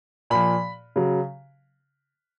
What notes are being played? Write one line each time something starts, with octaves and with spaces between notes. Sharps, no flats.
A#2 F3 B5
C#3 F#3